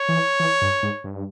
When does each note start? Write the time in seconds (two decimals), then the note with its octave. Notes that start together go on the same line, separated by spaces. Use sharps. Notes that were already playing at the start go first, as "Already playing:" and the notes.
Already playing: C#5
0.09 E3
0.40 E3
0.62 G2
0.83 G#2
1.04 G2